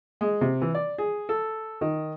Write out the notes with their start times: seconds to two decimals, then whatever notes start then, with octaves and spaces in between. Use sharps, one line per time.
0.21 G#3
0.41 C3
0.62 E3
0.75 D5
0.98 G#4
1.29 A4
1.81 D#3